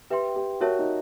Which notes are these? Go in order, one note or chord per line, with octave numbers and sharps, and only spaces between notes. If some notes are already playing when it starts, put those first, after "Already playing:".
G4 B4 E5 G5 C6
G4
F#4 A#4 C#5 E5 A5
D#4